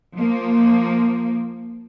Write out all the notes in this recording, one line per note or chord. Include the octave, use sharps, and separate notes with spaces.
F3 A#3